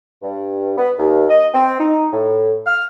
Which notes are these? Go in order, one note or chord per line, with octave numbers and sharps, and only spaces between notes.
G2
B3
D#2
D#5
C4
D#4
A2
F6